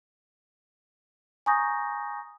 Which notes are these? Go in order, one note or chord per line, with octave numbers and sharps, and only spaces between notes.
G#5 A#5 C#6 D#6 G6 A#6